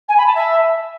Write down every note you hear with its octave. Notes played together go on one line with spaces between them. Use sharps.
G#5
B5
A5
E5